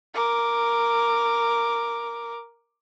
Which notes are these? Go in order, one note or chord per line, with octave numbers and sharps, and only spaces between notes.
A#4 D6